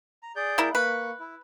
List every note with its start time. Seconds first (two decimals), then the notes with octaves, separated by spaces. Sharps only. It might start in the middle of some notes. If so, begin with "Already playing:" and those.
0.23 A#5
0.36 G#4 D5 G6
0.58 A#3 E4
0.75 A#3 B4 C#6
1.20 E4